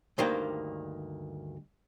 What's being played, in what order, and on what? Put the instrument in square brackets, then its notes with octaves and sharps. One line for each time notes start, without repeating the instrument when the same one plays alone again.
[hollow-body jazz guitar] D2 G2 D#3 A#3 C5 G5